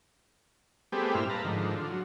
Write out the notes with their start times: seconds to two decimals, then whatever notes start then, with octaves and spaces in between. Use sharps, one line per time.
0.92 G3 A3 B3 C4 G4 G#4
1.15 G2 A#2 C4 E4 F6
1.30 B4 F5 A5 A#5
1.44 G#2 D3 D#3 F3
1.76 D3 F4
1.91 F#3